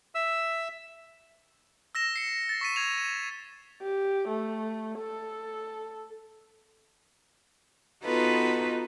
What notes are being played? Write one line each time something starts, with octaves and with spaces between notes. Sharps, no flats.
E5 E6
E6 A#6 E7
C7 C#7
A6
C#6 B6 D#7
G#6 F7
D#7
G4
A3
A4
B3 D#4 F4 F#4 A4 B4